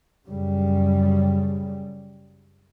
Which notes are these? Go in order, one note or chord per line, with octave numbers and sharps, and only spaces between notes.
F#2 C#3 G3